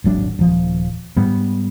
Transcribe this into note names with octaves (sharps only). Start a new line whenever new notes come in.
D#1 G#1 F#3 D4
D#1 F3
G#2 G3 B3